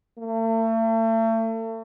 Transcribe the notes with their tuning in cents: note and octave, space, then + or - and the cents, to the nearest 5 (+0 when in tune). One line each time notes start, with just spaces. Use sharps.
A3 +40